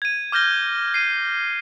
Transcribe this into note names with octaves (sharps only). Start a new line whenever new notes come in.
G#6 D#7
D6 F6 G6 A#6 G7
C7 D#7